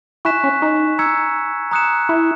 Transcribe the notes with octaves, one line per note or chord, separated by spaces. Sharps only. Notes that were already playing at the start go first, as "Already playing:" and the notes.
E4 G#5 C#6 F#6 B6 E7
C#4
D#4
A#5 E6 G#6 C#7
A#5 D#6 F#6 C#7 E7
E4